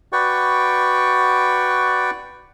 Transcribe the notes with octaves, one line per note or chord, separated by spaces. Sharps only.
F#4 B4 D5 G5 C#6